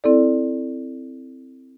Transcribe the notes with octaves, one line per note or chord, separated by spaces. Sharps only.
C4 E4 A4 D5